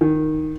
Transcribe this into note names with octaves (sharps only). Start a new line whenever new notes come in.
D#3